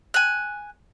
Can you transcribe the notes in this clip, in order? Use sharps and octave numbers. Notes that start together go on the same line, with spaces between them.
G#5 F#6